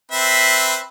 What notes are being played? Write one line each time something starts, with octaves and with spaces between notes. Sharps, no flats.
C4 B4 E5